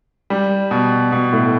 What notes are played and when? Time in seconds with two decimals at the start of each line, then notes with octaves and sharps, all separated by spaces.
0.30 G3
0.71 B2
1.12 B2
1.32 A2